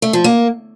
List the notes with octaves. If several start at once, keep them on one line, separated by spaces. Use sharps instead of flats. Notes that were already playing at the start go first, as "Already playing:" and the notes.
A3
F3
A#3